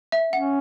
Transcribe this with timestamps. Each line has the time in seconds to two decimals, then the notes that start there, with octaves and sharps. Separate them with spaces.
0.12 E5
0.33 C#4 F#5